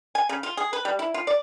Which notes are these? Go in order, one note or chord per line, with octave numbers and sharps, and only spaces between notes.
G#5
C#3
F4
G#4
B4
G3
E4
F4
D5